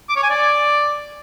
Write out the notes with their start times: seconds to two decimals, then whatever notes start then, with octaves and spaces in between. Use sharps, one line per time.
0.09 D6
0.16 C#5
0.23 G#5
0.30 D5